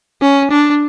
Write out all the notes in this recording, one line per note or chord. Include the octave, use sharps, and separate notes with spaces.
C#4
D4